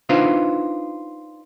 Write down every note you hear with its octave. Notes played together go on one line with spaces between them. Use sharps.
D4 D#4 F4 B4 C5